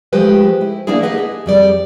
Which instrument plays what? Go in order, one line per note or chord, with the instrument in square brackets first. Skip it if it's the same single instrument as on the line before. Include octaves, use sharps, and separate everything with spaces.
[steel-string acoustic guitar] F3 G#3 A3 G4 B4 C5
E4
E3 A#3 B3 D4 E4 G#4
A3 D4 G4 B4 D#5 F#5
G#4
F2 G3 D5